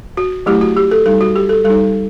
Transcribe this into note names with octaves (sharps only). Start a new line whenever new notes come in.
F#4
F#3 A3 E4 G4
F#4
G4
A4
G3 D#4 A4
F#4
G4
A4
G3 D#4 A4